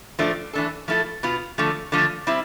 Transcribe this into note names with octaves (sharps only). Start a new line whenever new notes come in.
A2 F3 A3 D4
E3 A3 D4 A4
F3 A3 E4 A4
B2 B3 F4
D3 F3 A3
D3 F3 A3
G3 C4 E4